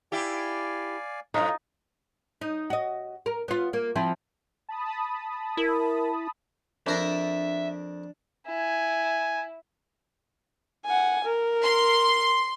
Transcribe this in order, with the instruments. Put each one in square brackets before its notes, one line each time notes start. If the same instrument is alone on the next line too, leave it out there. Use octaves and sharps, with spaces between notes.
[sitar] E4 G4 [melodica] D5 F5 G#5
[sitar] F#2 A2 [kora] D#4 F4
[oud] D#4
F#4 D#5
A#4
B3 F4
A#3
F3 C4 E4
[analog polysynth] A5 B5 D#6
[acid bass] E4 [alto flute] A#4
[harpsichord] F2 A#4 A#5 [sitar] D4 [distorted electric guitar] E5
[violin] E4 [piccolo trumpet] G#5
[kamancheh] F#5 G#5
A#4
[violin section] C6